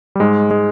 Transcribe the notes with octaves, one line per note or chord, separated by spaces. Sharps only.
G3
G#2 G#3
G#3